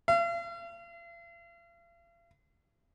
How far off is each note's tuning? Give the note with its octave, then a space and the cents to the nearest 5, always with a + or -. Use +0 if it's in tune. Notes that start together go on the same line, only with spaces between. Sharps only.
F5 -45